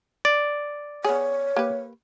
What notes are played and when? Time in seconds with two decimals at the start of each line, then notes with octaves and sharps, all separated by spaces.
0.25 D5
1.04 B3 G#4 C#5
1.56 A#3 G4 B4